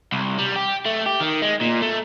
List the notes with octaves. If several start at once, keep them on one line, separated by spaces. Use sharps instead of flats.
C2
G3
G4
A3
G4
D#3
G#3
A#2
A3